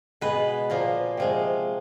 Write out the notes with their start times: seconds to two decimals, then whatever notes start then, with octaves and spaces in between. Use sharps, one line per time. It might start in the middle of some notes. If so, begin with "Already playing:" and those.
0.21 B2 G#3 B3 B4
0.70 A#2 F3 A#3
1.17 C3 F3 G#3